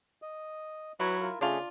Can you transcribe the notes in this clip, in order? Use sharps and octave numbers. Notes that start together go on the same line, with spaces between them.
D#5
F#3 E4 B4
F4 A#4
C#3 A3 C#4 D4 F4 G#4